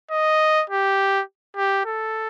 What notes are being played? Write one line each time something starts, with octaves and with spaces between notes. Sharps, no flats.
D#5
G4
G4
A4